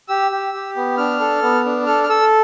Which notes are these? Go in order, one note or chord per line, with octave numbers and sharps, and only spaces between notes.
G4 E6
G4
G4
B3
D4 F6
A4
B3
D4
A4 F6
F6
A4 E6